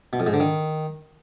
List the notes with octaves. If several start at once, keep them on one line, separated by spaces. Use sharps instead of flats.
B2
F2
G#2
D3
D#3